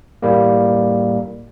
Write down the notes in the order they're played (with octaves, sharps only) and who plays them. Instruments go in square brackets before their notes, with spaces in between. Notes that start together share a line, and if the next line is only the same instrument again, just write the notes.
[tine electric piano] A2 G3 A#3